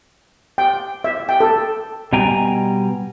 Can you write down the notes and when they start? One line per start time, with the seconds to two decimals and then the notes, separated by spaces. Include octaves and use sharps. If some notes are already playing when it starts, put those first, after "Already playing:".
0.58 G5
1.04 E5
1.29 G5
1.40 A4
2.12 B2 G3 B3 G5 G#5 A#5